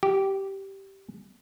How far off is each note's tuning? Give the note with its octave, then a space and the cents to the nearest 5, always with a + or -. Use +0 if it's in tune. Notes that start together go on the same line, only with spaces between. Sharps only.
G4 -10